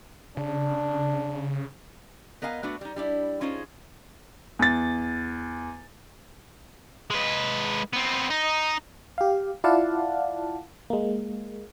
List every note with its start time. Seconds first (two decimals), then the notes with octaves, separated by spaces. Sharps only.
0.37 C#3 D4
2.42 B3 A#4 D#5 F5 G#5
2.63 A3 B3 D4 F#4
2.81 G3 D#4
2.96 G3 D4 E4
3.41 C#4 D#4 F4 G#4 C5
4.59 E2 A6
7.10 G#3 B4
7.93 B3 C4
8.30 D#4
9.18 G4 F5
9.64 E4 F4 D5 F5 F#5 A5
10.90 G#3 A#3